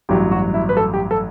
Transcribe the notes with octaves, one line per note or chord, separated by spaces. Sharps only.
A1 G2 F#3 G4
F#4
E4
B4
A4
G4
A4